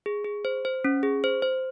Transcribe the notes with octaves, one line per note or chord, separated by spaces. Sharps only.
G#4
G#4
C5
C5
C#4
G#4
C5
C5